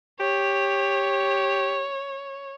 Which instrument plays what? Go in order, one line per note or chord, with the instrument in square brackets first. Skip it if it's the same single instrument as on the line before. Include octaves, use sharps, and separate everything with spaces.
[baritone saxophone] G4 [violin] C#5